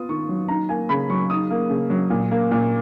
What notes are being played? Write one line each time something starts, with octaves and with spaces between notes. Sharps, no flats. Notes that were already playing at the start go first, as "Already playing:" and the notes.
Already playing: B3 F4 D#6
D#3 C#6
F#3
D#4 A#5
A#3 G#5
C#3 B5
F#3 C#6
D#4 D#6
A#3
C#3
F#3
A#2
A#3
A#2